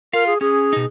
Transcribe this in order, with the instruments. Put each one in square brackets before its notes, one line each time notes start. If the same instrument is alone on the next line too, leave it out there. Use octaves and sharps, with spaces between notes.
[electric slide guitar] F4 F5 [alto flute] A#4
[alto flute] G#4
[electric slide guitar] C#4 [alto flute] G#4
[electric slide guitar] B2 D#4